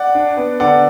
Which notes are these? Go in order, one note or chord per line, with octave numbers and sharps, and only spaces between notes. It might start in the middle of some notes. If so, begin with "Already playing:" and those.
Already playing: D5 F#5
D4
B3
D3 D5 F#5